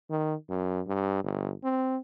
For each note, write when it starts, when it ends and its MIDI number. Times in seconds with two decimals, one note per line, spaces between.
0.10 0.35 51
0.49 0.81 42
0.87 1.23 43
1.24 1.53 31
1.64 1.97 60